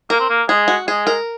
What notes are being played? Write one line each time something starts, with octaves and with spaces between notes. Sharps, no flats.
A#3 A#4
C4
A#3
G#3 G#4
F#4
G#3 G#4
A#4